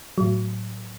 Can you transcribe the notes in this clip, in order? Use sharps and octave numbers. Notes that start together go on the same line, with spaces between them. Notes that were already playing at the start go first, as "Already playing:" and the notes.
A2 F#3